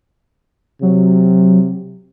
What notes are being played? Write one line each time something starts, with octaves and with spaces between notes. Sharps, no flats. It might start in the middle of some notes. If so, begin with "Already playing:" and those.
C3 F#3